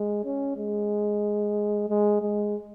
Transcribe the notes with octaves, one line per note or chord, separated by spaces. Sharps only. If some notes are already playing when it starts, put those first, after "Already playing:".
Already playing: G#3
C#4
G#3
G#3
G#3